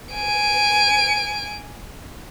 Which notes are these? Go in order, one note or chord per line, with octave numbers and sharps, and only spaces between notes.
G#5 D7